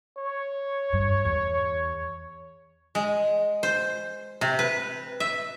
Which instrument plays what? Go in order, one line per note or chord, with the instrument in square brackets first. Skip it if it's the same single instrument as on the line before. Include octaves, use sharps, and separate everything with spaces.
[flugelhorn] C#5
[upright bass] G2
E2
[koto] G#3
C5
C3
B4
E5